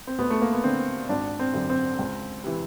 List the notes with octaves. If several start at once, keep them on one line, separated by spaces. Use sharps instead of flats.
C4
D2 B3
A3
A#3
B3
D3 C4
G#1 D4
C4
F#2 D3
C4
C#2
C3 E3